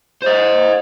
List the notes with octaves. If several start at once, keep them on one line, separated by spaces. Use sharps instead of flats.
C5 D#5